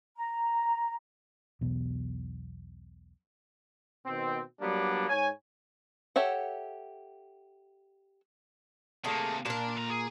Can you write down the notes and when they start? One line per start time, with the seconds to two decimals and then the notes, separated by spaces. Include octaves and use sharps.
0.16 A#5
1.61 B1 E2 B2
4.06 B2 D#3 C4
4.61 F#3 G3 A#3 B3 D4
5.09 G#2 C#5 G#5
6.16 G4 A4 C#5 E5 F#5
9.04 C3 A3 A#3 G#4
9.46 A#2 D4 A#4 A5
9.76 D3 A#5
9.90 G#4